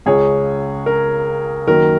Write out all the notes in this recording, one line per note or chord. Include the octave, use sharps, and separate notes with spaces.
C#2 C#3 G#3 G#4 C#5
A#4
F#2 D#3 F#3 A#3 A#4